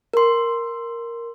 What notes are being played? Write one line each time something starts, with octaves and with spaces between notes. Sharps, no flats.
A#4 C6